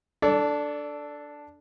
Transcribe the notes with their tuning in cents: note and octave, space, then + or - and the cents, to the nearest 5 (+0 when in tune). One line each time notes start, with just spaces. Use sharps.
D4 +0 A4 +0 D5 -35